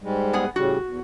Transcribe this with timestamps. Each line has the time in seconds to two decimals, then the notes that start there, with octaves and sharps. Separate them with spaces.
0.03 G#2 G3 G#3
0.33 B3 G#4 F#5
0.56 A2 C#3 G3 F#4
0.85 E2